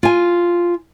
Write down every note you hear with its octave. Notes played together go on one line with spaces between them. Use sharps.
F4 G#5